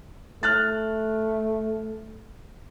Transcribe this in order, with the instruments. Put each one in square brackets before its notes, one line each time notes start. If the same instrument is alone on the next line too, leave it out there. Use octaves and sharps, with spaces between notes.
[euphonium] A3 [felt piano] F6 F#6 A6